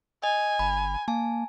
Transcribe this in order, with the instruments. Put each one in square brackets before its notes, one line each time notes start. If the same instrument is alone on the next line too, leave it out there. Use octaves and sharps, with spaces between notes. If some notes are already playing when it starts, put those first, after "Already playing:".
[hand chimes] D#5 [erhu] G#5
[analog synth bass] G1 [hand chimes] B5
[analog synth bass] A#3 [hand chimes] G#5 A5